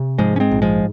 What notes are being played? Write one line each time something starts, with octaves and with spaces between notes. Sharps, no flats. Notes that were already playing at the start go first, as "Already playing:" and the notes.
Already playing: C3
G#2 F3 G#3
C#4
G#3 C4
A#1
F3 G#3